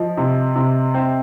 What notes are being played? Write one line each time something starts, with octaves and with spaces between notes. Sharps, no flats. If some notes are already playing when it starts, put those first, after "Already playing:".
Already playing: F3 D#5
C3
C3
C4